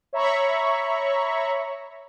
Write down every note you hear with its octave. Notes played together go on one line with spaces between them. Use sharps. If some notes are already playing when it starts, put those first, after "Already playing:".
C#5 E5 A#5 B5 C#6